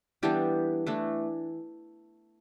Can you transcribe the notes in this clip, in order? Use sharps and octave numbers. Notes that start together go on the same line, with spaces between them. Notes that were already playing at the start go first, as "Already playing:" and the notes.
E3 G3 B3 D4 G4 A4
E3 A3 D4